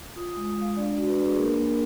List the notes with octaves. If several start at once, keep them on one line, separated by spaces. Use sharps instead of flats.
F4 D#6
D#6
G#3
G#3 F5
D4 D5
F#4
B4
D4
G#4
A#3 A#4
A#3
A#4